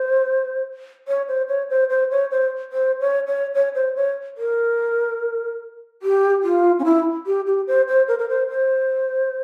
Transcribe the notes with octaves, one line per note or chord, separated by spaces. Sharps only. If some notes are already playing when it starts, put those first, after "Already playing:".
Already playing: C5
C#5
C5
C#5
C5
C5
C#5
C5
C5
C#5
C#5
C#5
C5
C#5
A#4
G4
F4
C#4
E4
G4
G4
C5
C5
A#4
A#4
C5
C5